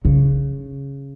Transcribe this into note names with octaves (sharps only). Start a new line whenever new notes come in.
C#3